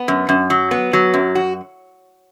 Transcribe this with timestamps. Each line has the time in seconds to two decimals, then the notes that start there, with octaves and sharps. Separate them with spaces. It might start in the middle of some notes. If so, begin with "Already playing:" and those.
Already playing: B3
0.08 F#2
0.29 F#2
0.50 F#3
0.71 B3
0.93 F#3
1.14 F#2
1.35 F#4